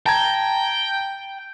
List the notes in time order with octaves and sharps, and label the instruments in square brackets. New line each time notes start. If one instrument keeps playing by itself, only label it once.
[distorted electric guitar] G5 [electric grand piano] A5 A#5 G#6